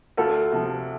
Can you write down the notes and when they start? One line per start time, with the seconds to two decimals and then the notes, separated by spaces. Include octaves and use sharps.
0.17 D2 F4 A4
0.52 C3 F3